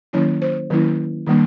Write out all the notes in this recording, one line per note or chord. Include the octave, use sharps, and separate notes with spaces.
D#3 F#3 A#3 C#4 E4 C#5
C5
D#3 F#3 A#3 C#4 E4
D#3 G3 A#3 D4